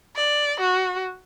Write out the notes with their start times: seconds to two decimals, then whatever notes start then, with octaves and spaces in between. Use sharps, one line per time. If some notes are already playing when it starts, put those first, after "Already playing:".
0.16 D5
0.60 F#4